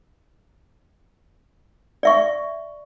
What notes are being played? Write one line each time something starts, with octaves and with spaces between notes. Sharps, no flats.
D5 E5 C#6